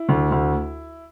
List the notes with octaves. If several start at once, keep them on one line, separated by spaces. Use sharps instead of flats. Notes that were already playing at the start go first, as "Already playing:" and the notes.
Already playing: E4
D2
D2